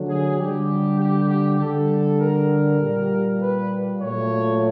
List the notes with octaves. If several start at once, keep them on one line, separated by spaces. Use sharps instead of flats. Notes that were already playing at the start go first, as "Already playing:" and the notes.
Already playing: D3 F#3 A3
G#4
D3 G3 G4
G4
G4
D3 G3 A4
A#4
A#2 G3
B4
A#2 F#3 A3 C#5